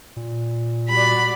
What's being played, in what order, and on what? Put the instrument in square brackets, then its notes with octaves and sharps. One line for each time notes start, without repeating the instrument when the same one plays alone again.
[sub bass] A#2
[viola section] G3 F#4 D5 [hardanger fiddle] B5